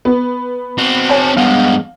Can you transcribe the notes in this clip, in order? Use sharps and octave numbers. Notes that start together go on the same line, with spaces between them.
B3
C4 F#4
C#5 G#5 A5
G2 G#3 B3 F5